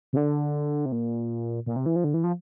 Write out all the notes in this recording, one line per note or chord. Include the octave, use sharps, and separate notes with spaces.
C3
D3
C3
A#2
A#2
C3
E3
F3
D3
E3
F3